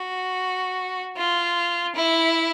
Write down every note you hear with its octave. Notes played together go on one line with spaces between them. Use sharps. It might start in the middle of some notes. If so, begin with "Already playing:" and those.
Already playing: F#4
F4
E4